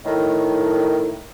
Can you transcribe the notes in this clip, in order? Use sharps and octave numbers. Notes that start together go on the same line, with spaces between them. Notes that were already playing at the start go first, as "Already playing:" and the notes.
A2 D#3